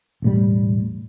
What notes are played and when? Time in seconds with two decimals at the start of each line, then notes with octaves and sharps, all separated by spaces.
0.22 E1 A2 G3